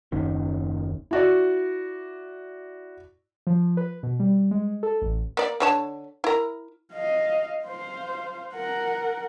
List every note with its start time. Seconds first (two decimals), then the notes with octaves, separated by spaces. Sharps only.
0.12 F#1 D#2 D#3 C#4
1.11 E4 F#4 D5
3.47 F3
3.77 B4
4.03 B2
4.20 G3
4.51 G#3
4.83 A4
5.02 A1
5.37 A#3 D5
5.60 D3 C#5 A5
6.24 E4 A#4
6.93 D#5 F5
7.65 C5 F5
8.54 A#4 F#5